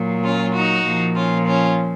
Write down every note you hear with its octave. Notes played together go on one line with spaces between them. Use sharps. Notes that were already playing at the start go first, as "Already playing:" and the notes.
Already playing: A#2 F#3
C#4 F4
D#4 F#4
A#2 F3
C#4 F4
C#4 F4